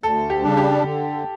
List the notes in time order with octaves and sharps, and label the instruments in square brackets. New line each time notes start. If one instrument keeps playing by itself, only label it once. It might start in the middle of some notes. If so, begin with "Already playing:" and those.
[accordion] D2 [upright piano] A4
[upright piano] G4
[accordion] C#3 G3 D4
[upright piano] G4
[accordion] D3